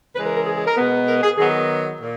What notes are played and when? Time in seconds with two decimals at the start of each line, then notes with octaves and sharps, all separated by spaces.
0.15 C#3 E3 G#3 B4
0.26 A#4
0.36 A#4
0.46 G#4
0.57 G#4
0.67 A#4
0.77 B2 G#3 B3
1.07 A#4
1.23 G#4
1.38 D#3 F#3 B3 G#4
2.00 A#2